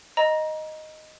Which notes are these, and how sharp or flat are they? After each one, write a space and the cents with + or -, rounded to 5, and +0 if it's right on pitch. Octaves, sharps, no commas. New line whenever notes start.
D#5 +0 A#5 +25